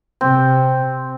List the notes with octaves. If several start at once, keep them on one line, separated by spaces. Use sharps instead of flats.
C3 C4